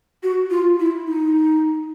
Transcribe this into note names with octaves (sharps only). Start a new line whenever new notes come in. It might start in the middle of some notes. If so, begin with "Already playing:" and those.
F#4
F4
E4
D#4